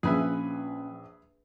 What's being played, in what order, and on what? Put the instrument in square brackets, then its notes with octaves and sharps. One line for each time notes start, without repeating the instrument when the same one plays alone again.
[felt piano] A#1 [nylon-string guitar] F3 C#4 G#5 [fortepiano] G#4 B4 E5